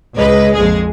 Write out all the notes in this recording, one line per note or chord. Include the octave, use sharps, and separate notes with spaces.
C#2 G#3 B4 D#5
A#1 F2 G#3 G#4